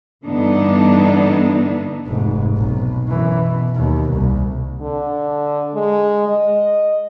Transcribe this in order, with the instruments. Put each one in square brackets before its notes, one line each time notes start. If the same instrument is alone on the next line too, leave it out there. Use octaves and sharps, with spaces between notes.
[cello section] G2 D3 E3 B3 D4 D#4
[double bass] F1 G#2
B1
F#2 E3
B2
D#2 B2
C2
[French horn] D3
G#3
D#5